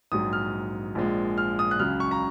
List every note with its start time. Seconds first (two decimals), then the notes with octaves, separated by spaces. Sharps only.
0.12 A#1 G#2 F#3 D#6
0.33 F6
0.95 A#1 A#2 F3 G#3
1.38 F6
1.59 D#6
1.71 F#6
1.79 C#2 C#3 F#3 F6
2.00 C#6
2.11 A#5